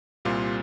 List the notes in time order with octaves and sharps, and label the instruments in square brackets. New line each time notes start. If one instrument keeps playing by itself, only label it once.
[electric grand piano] C2 A#2 G3 C4 F4